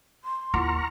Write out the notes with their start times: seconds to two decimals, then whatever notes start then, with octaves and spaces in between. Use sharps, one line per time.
0.24 C6
0.54 D#2 E4 F4 F#5 A#5 C#6 F6